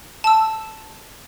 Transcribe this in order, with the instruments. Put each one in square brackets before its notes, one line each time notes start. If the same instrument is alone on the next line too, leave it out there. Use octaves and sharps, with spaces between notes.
[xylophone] A5 E6